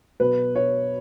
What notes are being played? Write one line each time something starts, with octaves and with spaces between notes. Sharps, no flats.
B2 F#3 B4
C#5